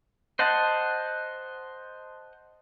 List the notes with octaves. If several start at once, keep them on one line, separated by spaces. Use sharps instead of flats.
C5 D#5 F#5 A5